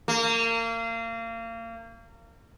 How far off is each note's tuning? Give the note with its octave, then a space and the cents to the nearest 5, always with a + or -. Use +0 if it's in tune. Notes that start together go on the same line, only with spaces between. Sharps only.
A#3 -30